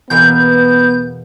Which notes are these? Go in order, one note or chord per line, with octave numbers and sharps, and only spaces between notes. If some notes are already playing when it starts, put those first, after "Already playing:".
E2 B2 A#3 B3 G6